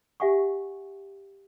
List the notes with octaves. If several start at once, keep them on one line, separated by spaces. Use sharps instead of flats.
G4 E5 F#5 G#5 C#6